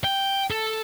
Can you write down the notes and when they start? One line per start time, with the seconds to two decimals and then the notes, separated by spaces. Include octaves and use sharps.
0.04 G5
0.51 A4